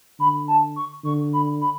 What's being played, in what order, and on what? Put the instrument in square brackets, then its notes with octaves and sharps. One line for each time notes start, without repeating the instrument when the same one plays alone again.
[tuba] D3 [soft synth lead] B5
[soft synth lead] A5
C#6
[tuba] D3 [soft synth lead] C#6
[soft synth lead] B5
B5